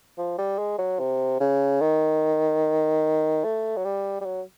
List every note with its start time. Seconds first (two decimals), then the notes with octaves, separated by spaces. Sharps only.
0.18 F3
0.38 G3
0.58 G#3
0.78 F#3
0.99 C3
1.40 C#3
1.81 D#3
3.44 A3
3.76 F#3
3.85 G3
4.21 G3
4.25 F#3